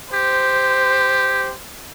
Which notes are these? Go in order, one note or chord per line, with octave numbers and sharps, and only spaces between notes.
G4 C5